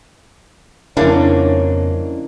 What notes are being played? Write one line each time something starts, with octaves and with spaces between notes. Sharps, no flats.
F2 G#2 C#3 A#3 C#4 D4 E4 C#5